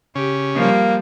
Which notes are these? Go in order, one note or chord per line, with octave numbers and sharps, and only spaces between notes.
C#3 C#4 G4
F3 G3 A#3